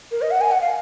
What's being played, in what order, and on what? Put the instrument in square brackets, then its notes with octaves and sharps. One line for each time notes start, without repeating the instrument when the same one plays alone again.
[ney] A#4
D#5
F#5
G#5
F#5
F5